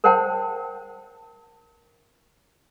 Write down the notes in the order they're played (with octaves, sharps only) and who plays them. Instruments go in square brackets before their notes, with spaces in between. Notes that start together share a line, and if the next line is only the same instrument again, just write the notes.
[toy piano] A#4 C5 C#5 F#5 G5 A5